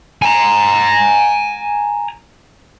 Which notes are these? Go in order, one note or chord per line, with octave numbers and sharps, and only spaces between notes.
G#5 A#5